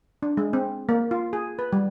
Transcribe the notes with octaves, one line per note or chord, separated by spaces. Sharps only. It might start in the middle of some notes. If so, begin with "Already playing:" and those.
D4
G#3
C4
A#3
F4
G#4
B4
G3